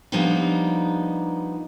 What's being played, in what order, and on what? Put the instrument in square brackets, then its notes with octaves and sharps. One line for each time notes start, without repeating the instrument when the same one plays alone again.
[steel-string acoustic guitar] F3 G3 A#3 B3 D4 D#4